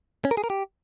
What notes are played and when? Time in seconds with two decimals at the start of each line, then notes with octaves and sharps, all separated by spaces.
0.25 C#4
0.31 A#4
0.37 G#4
0.44 A#4
0.50 G4